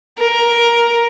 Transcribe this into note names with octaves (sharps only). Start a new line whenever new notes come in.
A#4